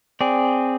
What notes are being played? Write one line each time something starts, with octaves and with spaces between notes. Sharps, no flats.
C4 G#4 D5